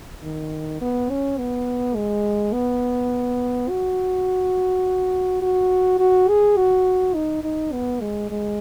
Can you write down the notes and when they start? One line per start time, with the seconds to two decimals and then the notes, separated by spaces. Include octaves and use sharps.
0.22 D#3
0.81 B3
1.10 C#4
1.38 B3
1.95 G#3
2.53 B3
3.69 F#4
5.42 F#4
5.99 F#4
6.29 G#4
6.57 F#4
7.14 D#4
7.43 D#4
7.72 B3
8.01 G#3
8.30 G#3